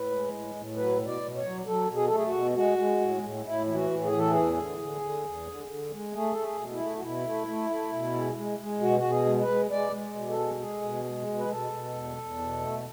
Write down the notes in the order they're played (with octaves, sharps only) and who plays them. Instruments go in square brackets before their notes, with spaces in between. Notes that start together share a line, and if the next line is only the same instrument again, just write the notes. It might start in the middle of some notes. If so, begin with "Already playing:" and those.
Already playing: [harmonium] A2 B4
G#3
A2
A2
F#3 B4
B2
D5
B2
C#5
F#3
F#3 A4
B2
G#4
A4
A3
G#4
F#4
B2
G#3 F#4
G#3
A2
A2
A2 E4
E3 E4
F#4
A2
G#4
E3
A4
E2 G#4
D3
D3
D3
E2
D3
D3
G#3
A3 G#4
A3 A4
G#4
B2
E4
A3
F#4
B2 E4
A3
A3
A3
B2
G#3
G#3
G#3
B2 F#4
B2 F#4
G#4
G#3
B4
G#3
G#3 D5
G#3
B2
A4
G#3
G#3 G#4
B2
G#3
B2
B4
B2 A4
B2
E2
E2
B2
A3